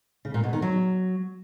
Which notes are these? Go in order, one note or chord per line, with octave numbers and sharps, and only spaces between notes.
C#3
A#2
B2
D#3
F#3